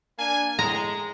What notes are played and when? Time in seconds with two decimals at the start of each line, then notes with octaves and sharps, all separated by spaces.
0.18 A#3 D4 G#5
0.59 A2 G#3 A#5